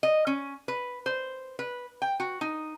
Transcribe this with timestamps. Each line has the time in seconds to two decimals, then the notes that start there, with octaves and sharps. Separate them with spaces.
0.03 D#5
0.27 C#4
0.68 B4
1.06 C5
1.59 B4
2.02 G5
2.20 F#4
2.41 D#4